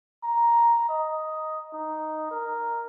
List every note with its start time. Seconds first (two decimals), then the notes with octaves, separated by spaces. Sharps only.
0.23 A#5
0.89 D#5
1.73 D#4
2.31 A#4